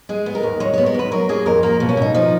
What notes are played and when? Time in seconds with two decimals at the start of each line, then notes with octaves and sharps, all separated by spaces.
0.09 G#3 G#4
0.26 B3
0.35 A#4
0.43 D#2
0.60 G#3 C#5
0.73 B3 C#5
0.86 A#4
0.94 G#2 B4
1.12 F#3 A#4
1.29 A#3 G#4
1.46 F2 A#4
1.63 A#3 A#4
1.80 B2
1.89 C#4
1.97 B2 D#4
2.15 F3 D#4